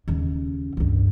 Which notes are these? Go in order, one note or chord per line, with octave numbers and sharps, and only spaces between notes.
D#2 C#3
C#2 G2